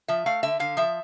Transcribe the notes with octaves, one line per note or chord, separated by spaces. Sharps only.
F3 E5
A3 F5
D3 E5
D3 F5
F3 E5